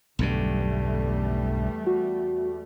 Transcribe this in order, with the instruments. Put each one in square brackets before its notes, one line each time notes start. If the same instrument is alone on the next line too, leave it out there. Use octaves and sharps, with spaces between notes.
[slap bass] B1 G2 D3 [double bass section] E2 G3 A3
[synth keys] F#4